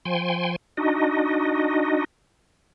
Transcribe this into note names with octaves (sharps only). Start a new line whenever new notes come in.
F3 G5 G#5 C6
D4 D#4 F#4 D#5